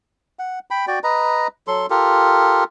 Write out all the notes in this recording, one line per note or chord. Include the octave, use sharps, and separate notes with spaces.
F#5
G5 B5
F#4 D5 G5
B4 D#5 A#5
F#3 A4 C6
F4 G4 A4 A#4